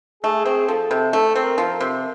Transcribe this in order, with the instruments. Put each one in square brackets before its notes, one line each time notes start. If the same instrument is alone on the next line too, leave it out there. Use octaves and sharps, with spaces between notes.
[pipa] A3 [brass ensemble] G#4
[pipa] C4
[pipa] F3 [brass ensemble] A4
[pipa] C3
[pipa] A3 [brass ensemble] A4
[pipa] C4
[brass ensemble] A#4
[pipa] F3
C3